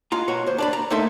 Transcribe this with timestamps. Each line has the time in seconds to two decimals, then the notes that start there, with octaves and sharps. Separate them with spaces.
0.12 G#3 F4 A#5
0.28 B2 F#4 C#5 A#5
0.46 D#2 C5
0.58 D4 D5 B5
0.73 A#5
0.90 A3 A#3 D#4 A4 E5 C6